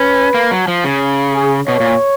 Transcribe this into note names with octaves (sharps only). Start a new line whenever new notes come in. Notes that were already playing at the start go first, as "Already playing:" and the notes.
Already playing: C#4 B4
A#3
F#3
F3
C#3
G#4
B2 C#5
A#2